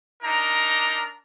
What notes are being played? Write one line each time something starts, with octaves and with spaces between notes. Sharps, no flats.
D4 D#4 A#4 A#5